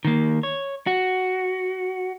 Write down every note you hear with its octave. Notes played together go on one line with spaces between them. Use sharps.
D#3 A#3
C#5
F#4